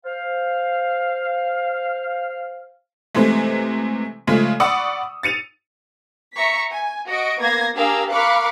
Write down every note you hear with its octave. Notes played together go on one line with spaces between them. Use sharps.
C5 F5
C3 E3 G#3 A3
C#3 F3 G#3 A3
D5 F#5 B5 C#6 D#6 E6
A6 C#7 D#7 F7
E5 A#5 C#6 B6
G#5
F#4 D#5 C#6 D7
A#3 B3 G#6 A#6 C7
D4 G4 G#4 A#4 F5 E6
A#4 F5 B5 C#6 D6 F#6